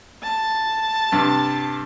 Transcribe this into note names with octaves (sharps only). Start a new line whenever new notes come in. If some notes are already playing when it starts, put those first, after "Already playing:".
A5
G2 C3